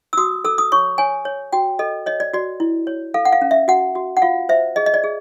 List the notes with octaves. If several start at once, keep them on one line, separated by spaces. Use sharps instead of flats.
E6
F#4 D#6
A4 E6
D#6
C#5 C#6
C#5 G#5
C#5
F#4 G5
A4 D#5
C#5 D#5
D5
F#4 D5
E4
C#5
A4 F5
F#5
F5
C#4
E5
F#4 F#5
F#4
F#5
F4 F5
C5 E5
G#4 D#5
D#5
D5
G#4